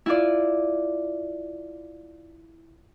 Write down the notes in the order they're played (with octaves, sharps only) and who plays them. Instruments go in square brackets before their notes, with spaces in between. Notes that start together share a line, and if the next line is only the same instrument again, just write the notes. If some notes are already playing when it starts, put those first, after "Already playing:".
[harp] E4 F4 D5